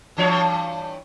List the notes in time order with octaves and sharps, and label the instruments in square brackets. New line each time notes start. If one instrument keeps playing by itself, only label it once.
[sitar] G2 E3 C#5